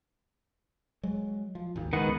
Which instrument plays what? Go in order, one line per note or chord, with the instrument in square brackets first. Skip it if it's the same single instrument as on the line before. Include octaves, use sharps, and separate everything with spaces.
[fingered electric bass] F#3 G#3
F3
G#1 D#2
[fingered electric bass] G#1 C#2 G#2 [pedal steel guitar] D#3 B3 F#5